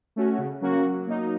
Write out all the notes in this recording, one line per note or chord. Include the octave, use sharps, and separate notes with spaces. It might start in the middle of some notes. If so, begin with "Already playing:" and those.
A3 C#4 F#4
C#3
F#3 A#3 C#4 F#4
F#3
A#3 D#4